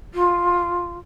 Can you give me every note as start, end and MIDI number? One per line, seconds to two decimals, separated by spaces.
0.14 0.97 65